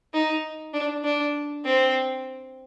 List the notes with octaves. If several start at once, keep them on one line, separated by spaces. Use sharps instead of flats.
D#4
D4
D4
C4